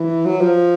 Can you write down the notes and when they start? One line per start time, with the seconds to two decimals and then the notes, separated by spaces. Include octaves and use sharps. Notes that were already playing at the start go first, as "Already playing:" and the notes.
Already playing: E3
0.25 F#3
0.41 F3